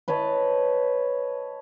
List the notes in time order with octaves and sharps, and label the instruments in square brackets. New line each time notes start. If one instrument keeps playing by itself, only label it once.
[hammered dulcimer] B4 C#5 D#5 A5